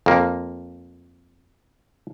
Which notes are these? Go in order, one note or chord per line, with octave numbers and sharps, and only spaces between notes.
F2 A#3